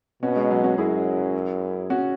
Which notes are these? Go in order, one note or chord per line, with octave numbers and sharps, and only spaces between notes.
B2 C#4 F#4
G#3
F#3
C#4 F#4
F#2 E4 G#4
C#4 F#4